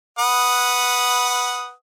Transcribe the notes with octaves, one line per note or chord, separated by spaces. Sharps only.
B4 F#5 D#6